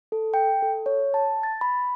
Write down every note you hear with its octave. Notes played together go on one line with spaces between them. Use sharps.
A4
G5
A4
C#5
A5
A6
B5